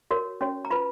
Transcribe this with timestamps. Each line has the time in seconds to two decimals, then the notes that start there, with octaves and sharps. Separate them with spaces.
0.11 F#4 A#4 C#5
0.41 C#4 F#4 C#5
0.65 A#5
0.70 F4 B4 B5